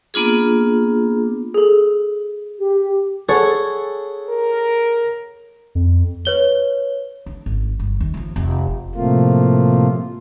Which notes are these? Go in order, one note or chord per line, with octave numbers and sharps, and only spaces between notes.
A#3 B3 D4 F4 G#4
G#4 A4
G4
G#4 A4 C#5 F#5
A#4
F2
B4 C#5 G7
D4
G#1
G1
D#2
E3 F3
F1 E2
A2 C3 F3 A3 A#3 F4